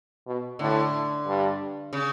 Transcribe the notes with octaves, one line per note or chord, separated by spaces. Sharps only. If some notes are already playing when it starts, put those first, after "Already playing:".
B2
A2 D3
G2
C#3